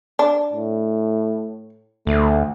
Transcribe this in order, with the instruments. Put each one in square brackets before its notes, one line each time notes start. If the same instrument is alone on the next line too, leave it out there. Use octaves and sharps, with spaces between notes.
[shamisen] D4
[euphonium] A2
[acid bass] D2 [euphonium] A3